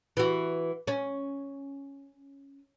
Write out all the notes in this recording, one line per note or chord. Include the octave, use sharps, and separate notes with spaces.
E3 F#4
C#4